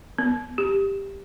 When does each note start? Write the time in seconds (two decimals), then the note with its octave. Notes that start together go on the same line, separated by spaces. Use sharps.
0.18 B3
0.58 G4